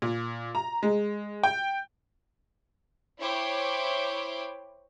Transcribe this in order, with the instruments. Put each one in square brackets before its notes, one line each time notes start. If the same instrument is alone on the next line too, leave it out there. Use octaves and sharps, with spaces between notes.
[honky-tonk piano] A#2
A#5
G#3
G5
[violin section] E4 C5 C#5 G5 B5 D6